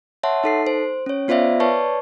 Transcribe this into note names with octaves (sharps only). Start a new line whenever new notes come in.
C#5 E5 F#5 A5 C6
D#4 A4 C7
C5
C#4 C#5
B3 F4 C5 D5 E5 F5
B4 C#5 D5 A5 C#6